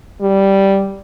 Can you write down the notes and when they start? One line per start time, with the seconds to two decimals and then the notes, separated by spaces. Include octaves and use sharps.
0.21 G3